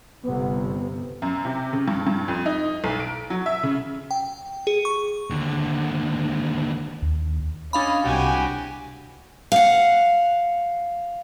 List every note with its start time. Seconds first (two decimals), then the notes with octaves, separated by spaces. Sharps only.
0.23 G1 C3 B3
1.22 F#2
1.45 C3
1.73 C#3
1.88 G2
2.07 G2
2.28 F2
2.46 D#4
2.84 B1
3.00 D7
3.30 F#3
3.46 E5
3.63 C#3
4.11 G5
4.67 G#4
4.85 C#6
5.30 D#2 D3
7.02 D#2
7.73 C#4 D4 D#5 F5 B5
8.04 C2 C3 F#4 G4 G#5
9.52 F5 F#5